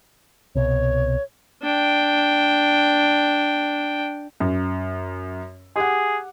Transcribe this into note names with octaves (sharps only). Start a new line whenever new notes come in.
C2 B2 C#5
D4 G5
F#2
G4 G#4 F#5